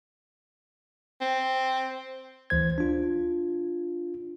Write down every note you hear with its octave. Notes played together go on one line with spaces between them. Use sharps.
C4
D2 E3 C5 G#6
D4 F4